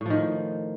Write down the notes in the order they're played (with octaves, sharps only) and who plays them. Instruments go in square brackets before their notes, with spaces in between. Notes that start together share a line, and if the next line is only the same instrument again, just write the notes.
[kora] A2
F3
D#3